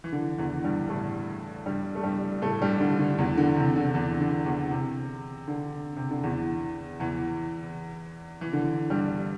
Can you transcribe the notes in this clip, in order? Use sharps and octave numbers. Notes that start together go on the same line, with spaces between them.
E3
D3
E2 E3
G2 G3
A2 A3
G2 G3
A3
G2 G3
A2 A3
G2 G3
D3
D3
E2 E3
D3
C3
D3
E2 E3
D3
E2 E3
C3
D3
C3
D3
E2 E3
E2 E3
E3
D3
G2 G3